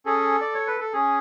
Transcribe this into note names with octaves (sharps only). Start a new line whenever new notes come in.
C#4 G#4 A4
D5
C#5
B4
A4
C#4 G#4